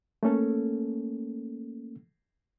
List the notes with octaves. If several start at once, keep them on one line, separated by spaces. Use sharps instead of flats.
A3 A#3 C#4 A4